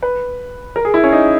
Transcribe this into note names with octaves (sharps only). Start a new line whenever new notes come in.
B4
A#4
G#4
E4
C#4
D#4